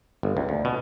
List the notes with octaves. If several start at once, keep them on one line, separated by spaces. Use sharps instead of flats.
G1
C#2
D2
B2